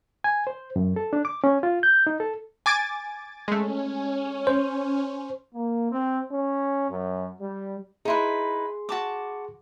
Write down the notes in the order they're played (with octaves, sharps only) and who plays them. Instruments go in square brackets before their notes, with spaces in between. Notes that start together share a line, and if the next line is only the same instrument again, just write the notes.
[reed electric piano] G#5
C5
F#2
A4
D4
D6
C#4
F4
G6
D#4
A4
[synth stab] G#5 D6 A6
[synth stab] G#3 A3 [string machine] C#4
[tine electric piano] C5
[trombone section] A#3
C4
C#4
F#2
G3
[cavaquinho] D#4 E4 B4 [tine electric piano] G#4 C6
[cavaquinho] F#4 A5 D6